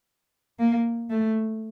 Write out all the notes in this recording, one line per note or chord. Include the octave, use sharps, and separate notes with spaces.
A#3
A3